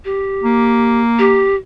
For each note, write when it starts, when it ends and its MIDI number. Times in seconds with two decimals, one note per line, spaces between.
0.05 1.01 67
0.43 1.50 58
1.19 1.55 67